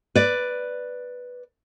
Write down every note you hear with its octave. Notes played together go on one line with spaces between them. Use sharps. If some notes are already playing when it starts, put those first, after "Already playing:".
B4 D5